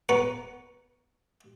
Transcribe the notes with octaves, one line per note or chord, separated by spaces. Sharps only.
B3 B4 A#5 C#6